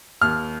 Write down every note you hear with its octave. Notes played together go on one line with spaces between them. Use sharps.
D#2 F6